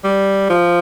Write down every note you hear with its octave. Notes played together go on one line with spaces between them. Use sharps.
G3
F3